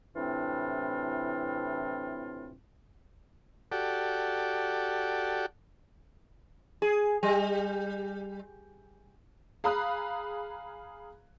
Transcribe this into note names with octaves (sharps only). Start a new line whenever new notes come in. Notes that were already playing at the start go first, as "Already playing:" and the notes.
A2 C3 E3 C4 D4 F4
F#4 G4 A4 D5
G#4
G3
G#4 F5 A#5 B5 D#6 F#6